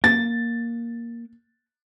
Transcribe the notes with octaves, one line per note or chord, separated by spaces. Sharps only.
A#3 A6